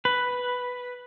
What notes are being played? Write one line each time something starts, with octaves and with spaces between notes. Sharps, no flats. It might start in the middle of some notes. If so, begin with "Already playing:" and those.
B4